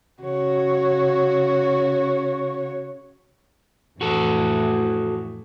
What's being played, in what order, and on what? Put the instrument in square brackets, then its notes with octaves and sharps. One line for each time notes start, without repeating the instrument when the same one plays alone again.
[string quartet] C#3 F#4 C#5
[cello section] F2 A2 E3 [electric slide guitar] F#4 A4